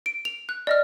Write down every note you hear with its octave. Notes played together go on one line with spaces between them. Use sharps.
D7
F7
F#6
D5 D#5 F6